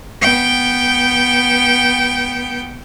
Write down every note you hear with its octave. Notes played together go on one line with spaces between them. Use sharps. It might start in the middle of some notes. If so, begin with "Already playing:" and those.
B3 G5